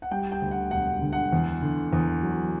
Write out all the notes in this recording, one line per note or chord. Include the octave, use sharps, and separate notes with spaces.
F#5
G3 G5
G5
D2
F#5
E1 F#5
D3
F#5
E2
D3
E2
F#3